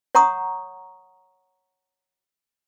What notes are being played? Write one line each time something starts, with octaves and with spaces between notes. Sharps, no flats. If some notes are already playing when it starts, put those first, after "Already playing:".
C#5 F#5 A#5 C#6 D#6